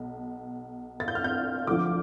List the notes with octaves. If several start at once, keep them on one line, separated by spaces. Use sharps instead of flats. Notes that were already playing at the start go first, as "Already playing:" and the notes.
Already playing: B1
A6
G6
F6
G6
D2 D3 F3 D6